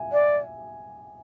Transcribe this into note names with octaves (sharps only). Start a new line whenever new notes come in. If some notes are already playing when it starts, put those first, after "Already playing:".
Already playing: E5 G#5
D5